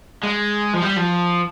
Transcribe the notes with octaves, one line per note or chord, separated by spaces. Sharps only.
G#3
F3
G3
F3